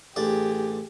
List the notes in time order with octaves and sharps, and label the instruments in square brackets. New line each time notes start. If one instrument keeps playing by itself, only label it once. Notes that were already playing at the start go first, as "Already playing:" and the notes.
[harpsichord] A1 D4 D5 [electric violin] G4 G#4